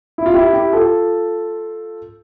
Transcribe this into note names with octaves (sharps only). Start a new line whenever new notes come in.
E4
F4
E4 G4
E4 G4
F4 A4